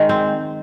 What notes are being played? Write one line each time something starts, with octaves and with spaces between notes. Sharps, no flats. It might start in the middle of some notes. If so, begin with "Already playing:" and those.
Already playing: D#3 G#3
C4